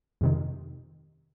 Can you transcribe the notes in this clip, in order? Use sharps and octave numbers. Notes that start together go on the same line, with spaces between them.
F2 C3 D#3